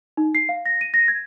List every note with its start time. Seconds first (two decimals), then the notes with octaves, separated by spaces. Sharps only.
0.17 D#4
0.35 C7
0.49 F5
0.66 A#6
0.81 D#7
0.94 A#6
1.08 G#6